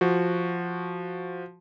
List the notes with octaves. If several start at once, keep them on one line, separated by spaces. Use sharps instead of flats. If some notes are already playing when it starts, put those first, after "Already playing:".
F3 F#4